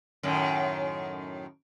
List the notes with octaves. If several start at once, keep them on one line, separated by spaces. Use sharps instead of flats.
F#2 A2 D#3